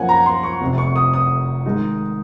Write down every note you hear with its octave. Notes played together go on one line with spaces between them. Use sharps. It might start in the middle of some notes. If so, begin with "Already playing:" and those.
Already playing: F#2 F3 A#3 C#4 F#5 G#5
A#5
C6
C#6
F1 F2 C3
C#6
D#6
D#6
G#2 D#3 G#3 D#4